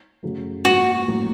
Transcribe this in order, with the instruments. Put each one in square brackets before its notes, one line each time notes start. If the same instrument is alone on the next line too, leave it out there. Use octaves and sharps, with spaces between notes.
[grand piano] F#2 C#3 F#3 A3
[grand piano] G#2 F3 A#3 [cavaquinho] F#4
[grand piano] A1 A2 F#3 A#3